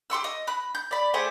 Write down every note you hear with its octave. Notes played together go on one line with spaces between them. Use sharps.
G4 C6 C#6 E6
D#5
B5 F#6
G6
D5 B5
A3 G4 G#4 C5